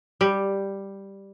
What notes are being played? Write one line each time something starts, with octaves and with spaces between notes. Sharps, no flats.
G3 G4